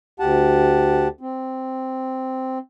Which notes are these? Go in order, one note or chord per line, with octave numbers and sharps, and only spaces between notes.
D2 G4 F#5 A5
C4